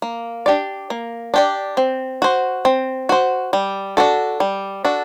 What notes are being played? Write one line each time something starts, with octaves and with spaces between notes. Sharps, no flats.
A#3
D4 G4 D5
A#3
D4 G4 D5
C4
F#4 C5
C4
F#4 C5
G3
D4 F#4 A4
G3
D4 F#4 A4